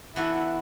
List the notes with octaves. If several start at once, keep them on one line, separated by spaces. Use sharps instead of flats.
E3 B3 D4 E4 F#4 A4